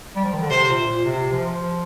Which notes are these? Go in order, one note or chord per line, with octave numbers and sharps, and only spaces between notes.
G3
F3
D#3
D3
C3 C5
A#2
A#2
C3
F3